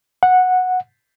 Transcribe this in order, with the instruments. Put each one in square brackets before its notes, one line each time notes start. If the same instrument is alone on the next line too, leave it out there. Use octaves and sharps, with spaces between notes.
[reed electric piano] F#5